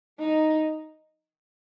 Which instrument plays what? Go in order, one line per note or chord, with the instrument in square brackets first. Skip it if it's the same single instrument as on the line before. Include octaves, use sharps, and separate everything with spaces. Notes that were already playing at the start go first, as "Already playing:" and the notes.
[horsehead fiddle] D#4